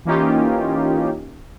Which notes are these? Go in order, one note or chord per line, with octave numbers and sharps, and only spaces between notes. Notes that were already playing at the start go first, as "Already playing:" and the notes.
E3 A#3 C#4 D#4 F4 G4